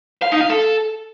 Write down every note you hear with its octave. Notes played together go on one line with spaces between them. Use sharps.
F5
D#4
F5
A4